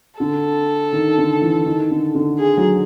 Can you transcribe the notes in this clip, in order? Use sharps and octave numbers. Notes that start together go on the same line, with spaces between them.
D3 A4
D#3
D3
E3
D#3
D3
D3
G#4
F#3